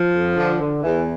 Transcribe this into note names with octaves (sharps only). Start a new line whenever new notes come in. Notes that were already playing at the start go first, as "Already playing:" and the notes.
Already playing: F3
F2
D3
D3
E2 E3